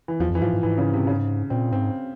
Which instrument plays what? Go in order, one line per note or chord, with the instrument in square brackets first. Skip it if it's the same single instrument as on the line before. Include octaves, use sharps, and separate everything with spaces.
[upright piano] E3
[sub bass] E2 [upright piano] F3
[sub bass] F2 [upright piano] E3
[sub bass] G#2 [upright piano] F3
[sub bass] G#2
[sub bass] G#2 [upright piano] E3
[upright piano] C#3
C3
C#3
[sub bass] A#2 [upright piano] C4
[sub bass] G#2 [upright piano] C4